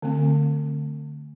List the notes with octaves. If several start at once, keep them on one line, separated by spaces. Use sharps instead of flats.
D3 A3 C4